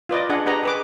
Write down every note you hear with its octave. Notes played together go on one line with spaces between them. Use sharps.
F4 B4 D5 D#5
D4 G#4 D#5 F#5
D4 G4 B4 D#5 F#5 A#5
G#4 B4 D6